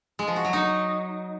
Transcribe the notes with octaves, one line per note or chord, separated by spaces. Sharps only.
G#3
F3
F#4
F#3
D#4